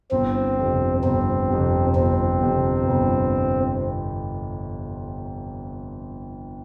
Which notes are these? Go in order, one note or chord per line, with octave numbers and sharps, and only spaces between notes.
G1 C4
F2 C3
G1 C4
F2 C3
G1 C4
F2 C3
G1